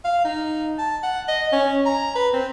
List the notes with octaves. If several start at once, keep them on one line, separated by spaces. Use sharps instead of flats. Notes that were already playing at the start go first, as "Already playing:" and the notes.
F5
D#4
A5
F#5
D#5
C#4
A#5
B4
C4